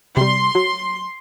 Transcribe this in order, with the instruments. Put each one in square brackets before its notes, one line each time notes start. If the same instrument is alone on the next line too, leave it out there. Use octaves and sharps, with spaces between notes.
[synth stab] C3 G3 [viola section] C6
[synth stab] F#3